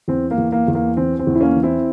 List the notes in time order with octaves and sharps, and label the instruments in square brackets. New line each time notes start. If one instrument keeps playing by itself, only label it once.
[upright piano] E2 C4
A#3
E2
A#3
E2
A#3
E3 C4
C4
E2
E4
A#3 C#4
E3
C4 E4